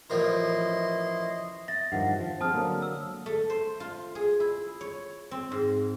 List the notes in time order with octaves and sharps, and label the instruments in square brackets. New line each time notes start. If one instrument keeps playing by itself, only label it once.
[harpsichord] A1 F3 A#4 [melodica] E4 D#5 C6
[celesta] E5 A6 A#6
[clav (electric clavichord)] G2 D#3 F3 [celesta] F#5
[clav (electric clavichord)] F3
[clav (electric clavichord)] C4 G#4 [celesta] A5 D#6 F6
[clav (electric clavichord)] D3 F#3 A#3
[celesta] E6
[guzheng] A3
C5
F4
G#4
E4
C#5
C4
G#2